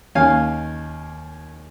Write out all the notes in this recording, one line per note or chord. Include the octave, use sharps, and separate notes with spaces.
D#2 C#4 F5 G#5